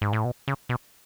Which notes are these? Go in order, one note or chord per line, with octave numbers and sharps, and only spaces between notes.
G#2
A2
B2
C#3
B2